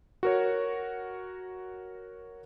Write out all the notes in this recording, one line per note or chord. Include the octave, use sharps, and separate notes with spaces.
F#4 A#4 C#5